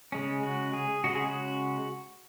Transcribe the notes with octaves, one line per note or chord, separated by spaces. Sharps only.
C#3 G#3 C#4
F#4
G#4
C#3 G#3 C#4 F#4
G#4
F#4